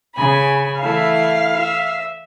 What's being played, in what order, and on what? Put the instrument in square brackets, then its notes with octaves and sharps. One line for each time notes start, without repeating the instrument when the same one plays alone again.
[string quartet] C#3 G#5 B5
[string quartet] E3 A3 E4 [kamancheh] F5
[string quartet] E5